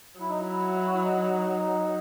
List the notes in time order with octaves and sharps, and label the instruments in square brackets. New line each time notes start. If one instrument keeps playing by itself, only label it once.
[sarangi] F#3 [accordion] E4
[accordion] D#4
E4
F#4
E4
D#4